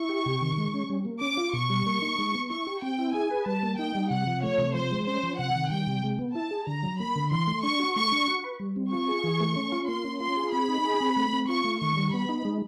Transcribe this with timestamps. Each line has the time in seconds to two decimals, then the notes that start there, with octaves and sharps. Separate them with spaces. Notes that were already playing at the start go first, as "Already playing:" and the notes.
Already playing: E4 C#6
0.09 G4
0.26 C3
0.41 D#3
0.57 G#3
0.74 C#4
0.90 G3
1.05 A#3
1.21 C#4 D6
1.37 F4
1.53 B2 C#6
1.70 G3
1.86 A#3
2.02 D#4
2.18 G#3
2.34 B3
2.50 E4 C#6
2.67 G4
2.82 C4 G5
2.99 E4
3.14 G#4 G#5
3.30 B4
3.46 G3 A5
3.63 A#3
3.78 D#4 G5
3.95 G3
4.10 C3 F#5
4.27 F3
4.43 A3 C#5
4.58 C3
4.74 F3 C5
4.91 G#3
5.07 C#4 C5
5.23 F3
5.39 C3 F#5
5.56 D#3
5.71 G3 G5
5.87 C3
6.03 G#3
6.19 B3
6.35 E4 A5
6.51 G#4
6.67 D3 A#5
6.83 F#3
7.00 A#3 B5
7.16 D3
7.31 E3 C6
7.47 A3
7.63 D4 C#6
7.80 F#4
7.96 A3 C#6
8.12 D4
8.27 F#4
8.44 B4
8.59 G3
8.76 C4
8.92 F4 C#6
9.08 G#4
9.24 E3
9.41 A3
9.56 C#4
9.72 F4
9.88 A#3 C6
10.04 C#4
10.20 F4 C6
10.37 G#4
10.52 C4 B5
10.69 D#4
10.85 G#4
11.01 C4
11.16 A3
11.33 C4
11.48 F4 C#6
11.64 A3
11.81 D#3 C#6
11.96 G3
12.13 B3 B5
12.29 D#4
12.45 G#3